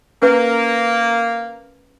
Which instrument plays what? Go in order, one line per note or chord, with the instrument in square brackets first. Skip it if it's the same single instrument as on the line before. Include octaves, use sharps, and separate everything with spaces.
[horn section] A#3 [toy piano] C#4 B4